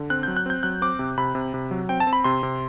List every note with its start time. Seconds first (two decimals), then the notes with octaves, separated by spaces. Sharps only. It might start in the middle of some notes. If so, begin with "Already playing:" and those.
Already playing: D3
0.10 C4 F#6
0.23 F#3 G6
0.37 F#6
0.46 C4 G6
0.63 F#3 F#6
0.82 C4 D6
0.99 C3
1.18 C3 B5
1.35 C3
1.54 C3
1.71 F#3
1.89 C4 G5
2.00 A5
2.07 C4
2.13 B5
2.24 C3 C6
2.43 C3